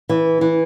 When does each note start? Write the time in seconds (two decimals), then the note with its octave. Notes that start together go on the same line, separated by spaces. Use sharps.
0.09 E3
0.41 E3